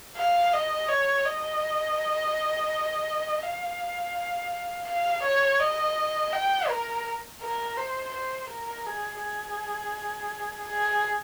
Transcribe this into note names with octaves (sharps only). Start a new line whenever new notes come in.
F5
D#5
C#5
D#5
F5
F5
C#5
D#5
G5
A#4
A#4
C5
C5
A#4
G#4
G#4
G#4